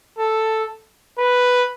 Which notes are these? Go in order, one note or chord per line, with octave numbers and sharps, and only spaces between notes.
A4
B4